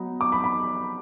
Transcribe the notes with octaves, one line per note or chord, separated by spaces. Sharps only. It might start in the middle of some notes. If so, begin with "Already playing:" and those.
Already playing: F#3 B3 D#4
D6
B5
B5